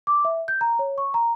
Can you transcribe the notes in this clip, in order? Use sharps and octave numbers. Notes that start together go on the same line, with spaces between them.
D6
E5
G6
A#5
C#5
C#6
A#5